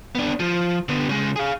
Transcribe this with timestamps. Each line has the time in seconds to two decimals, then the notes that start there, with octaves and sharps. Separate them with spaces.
0.15 B3 D4
0.40 F3
0.89 D3 B3
1.09 C#3 G#3
1.36 G#4 F5